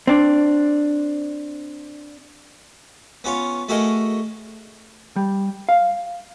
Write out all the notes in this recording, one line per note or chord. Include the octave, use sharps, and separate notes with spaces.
C4 D4
B3 C#4 F4 C#5
A3 F#4 G#4 A#4 D#5
G3
F5